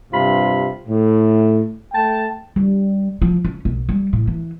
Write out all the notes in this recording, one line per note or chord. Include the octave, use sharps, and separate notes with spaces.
G2 C3 F4 B5
A2
A3 G5 A5
G3
F3
C#4
B1
G3
A2
E3